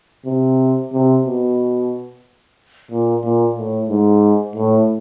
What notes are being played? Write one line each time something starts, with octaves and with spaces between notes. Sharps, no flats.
C3
C3
B2
A#2
A#2
A2
G#2
A2